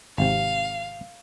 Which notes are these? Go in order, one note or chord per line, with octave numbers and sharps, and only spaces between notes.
G#1 C3 F5